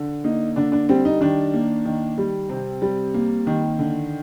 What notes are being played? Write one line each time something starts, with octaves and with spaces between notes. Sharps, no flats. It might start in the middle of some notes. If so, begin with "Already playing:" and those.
Already playing: D3
A#3 D#4
D3 D4
D4
G3 C4
D#4
D#3 D4
A#3
D#3
G3
C3 C4
G3
A#3
D#3
D3